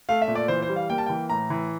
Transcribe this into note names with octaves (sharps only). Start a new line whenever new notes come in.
A3 F5
E5
A#2
D5
E3 C5
C5
G3
F5
A#3 G5
A5
E3 G5
A2 A#5
E3